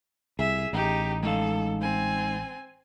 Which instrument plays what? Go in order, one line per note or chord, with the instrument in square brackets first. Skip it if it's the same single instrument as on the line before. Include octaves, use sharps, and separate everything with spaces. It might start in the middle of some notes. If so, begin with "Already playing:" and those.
[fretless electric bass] C2 [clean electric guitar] G#4 [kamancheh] E5
[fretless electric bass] A1 [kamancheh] D#4 G4
[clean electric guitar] G#3 D#4 F5 [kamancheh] A4
[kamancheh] C4 G#5